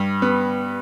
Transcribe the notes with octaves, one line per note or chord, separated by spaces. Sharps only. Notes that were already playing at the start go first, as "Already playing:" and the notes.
Already playing: G2
B3